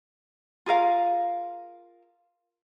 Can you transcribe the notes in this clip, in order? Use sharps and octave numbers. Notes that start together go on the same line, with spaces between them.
F4 G#4 A#4 F5